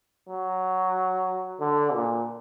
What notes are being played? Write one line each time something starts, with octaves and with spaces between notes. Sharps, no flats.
F#3
D3
A#2